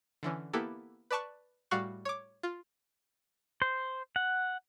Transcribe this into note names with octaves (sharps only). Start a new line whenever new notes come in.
D3 E3 C#4
A#3 B3 E4 G4 A4
B4 D5 A5 C#6 F#6
A2 G3 F#4 F5 C#6 F#6
C#5 D6
F4
C5
F#5